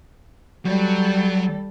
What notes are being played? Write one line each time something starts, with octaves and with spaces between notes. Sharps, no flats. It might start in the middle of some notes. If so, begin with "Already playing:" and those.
F#3 G3 A4